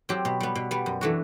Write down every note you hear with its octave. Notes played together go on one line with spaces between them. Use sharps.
F#3 C4 G4
B2
G3 B3
B2
G3 B3
F#2
E3 A3 D4 F#4